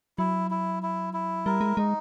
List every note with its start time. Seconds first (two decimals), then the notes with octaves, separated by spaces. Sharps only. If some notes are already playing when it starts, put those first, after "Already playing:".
0.18 F#3 E4
0.51 E4
0.83 E4
1.14 E4
1.46 G3 A#4
1.61 G#3
1.77 G#3 D#4